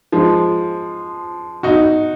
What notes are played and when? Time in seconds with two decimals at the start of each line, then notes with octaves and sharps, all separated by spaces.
0.12 F3 G#3
1.63 D#4 F#4